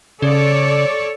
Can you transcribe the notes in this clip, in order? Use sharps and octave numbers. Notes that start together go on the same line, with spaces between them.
C#3 A4 C#5 D5